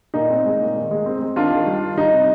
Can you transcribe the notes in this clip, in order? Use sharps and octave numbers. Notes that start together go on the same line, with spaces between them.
A#2 D#4
C4
G#3
A#2
D#3
G#3
C4
G#3
D#3 D4 F4
D#3
G3
D#3
G3 D#4
C3